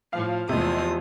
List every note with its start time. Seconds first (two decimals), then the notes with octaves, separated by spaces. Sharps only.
0.13 A2 F3 F5
0.49 E2 C3 F3 G#3 A3 D#6